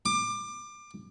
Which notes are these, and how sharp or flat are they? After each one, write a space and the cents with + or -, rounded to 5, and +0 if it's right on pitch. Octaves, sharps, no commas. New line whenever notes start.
D6 +25